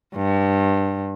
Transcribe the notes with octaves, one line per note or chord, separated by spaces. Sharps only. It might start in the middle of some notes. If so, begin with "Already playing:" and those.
G2